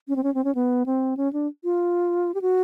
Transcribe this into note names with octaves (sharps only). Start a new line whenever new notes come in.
C#4
C4
C#4
C4
C#4
B3
C4
C#4
D4
F4
G4
F#4